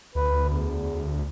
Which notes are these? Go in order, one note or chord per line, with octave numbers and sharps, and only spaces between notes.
D2 B4
E2